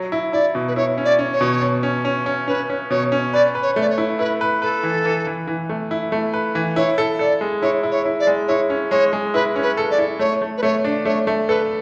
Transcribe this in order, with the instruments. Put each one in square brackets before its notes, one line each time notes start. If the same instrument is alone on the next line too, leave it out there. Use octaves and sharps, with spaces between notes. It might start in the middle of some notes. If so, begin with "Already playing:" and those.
Already playing: [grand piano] F#3
E4
[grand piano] E4 [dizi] D5
[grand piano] B2
[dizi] B4
[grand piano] E4 [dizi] C#5
[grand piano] C#4
[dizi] D5
[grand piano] C#4
[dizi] C#5
[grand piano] B2
B2
C#4
C#4
C#4
[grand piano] C#4 [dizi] B4
[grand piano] C#4
[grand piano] B2 [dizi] C#5
[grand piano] C#4
[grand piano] B4 [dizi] D5
[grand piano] B4
[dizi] C#5
[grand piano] A3 [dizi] D5
[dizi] C#5
[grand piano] E4
[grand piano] E4 [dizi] B4
[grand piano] B4
[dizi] A4 [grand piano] B4
[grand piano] E3
E3
E3
E3
A3
E4
A3
B4
E3
[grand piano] E4 [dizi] C#5
[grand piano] A4
[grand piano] A4 [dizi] D5
[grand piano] G#3
[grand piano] E4 [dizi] C#5
[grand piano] E4
[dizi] C#5
[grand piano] E4
[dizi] D5
[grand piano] G#3
[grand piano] E4 [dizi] C#5
[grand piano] C#4
[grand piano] G#3 [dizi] C#5
[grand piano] G#3
[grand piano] E4 [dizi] B4
[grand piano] C#4
[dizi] B4
[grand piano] A4
[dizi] D5
[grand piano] E4
[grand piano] A3 [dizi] C#5
[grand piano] A3
[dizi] B4
[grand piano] A3 [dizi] C#5
[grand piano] D4
[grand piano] A3 [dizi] C#5
[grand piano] A3
[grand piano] A4 [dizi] B4